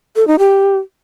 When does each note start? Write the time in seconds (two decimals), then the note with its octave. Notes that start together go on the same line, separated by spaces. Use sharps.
0.16 A4
0.27 D#4
0.39 G4